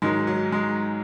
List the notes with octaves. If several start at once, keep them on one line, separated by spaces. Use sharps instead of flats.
G#2 D#3 F#3 G#3
F#3
G#3